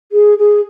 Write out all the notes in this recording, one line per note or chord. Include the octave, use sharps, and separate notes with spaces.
G#4
G#4